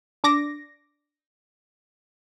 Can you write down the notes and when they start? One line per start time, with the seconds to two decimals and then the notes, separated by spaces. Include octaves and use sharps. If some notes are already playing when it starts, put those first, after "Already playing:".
0.24 D4 D6 A#6